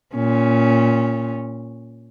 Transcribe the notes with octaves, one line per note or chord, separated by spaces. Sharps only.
A#2 C#4